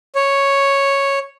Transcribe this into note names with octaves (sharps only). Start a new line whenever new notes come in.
C#5